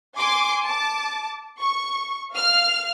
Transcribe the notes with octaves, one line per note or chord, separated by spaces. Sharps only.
G#5 C6 D6
A5 D6
C#6
F5 F6